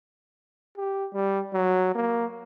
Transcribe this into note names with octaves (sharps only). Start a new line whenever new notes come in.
G4
G3
F#3
A#3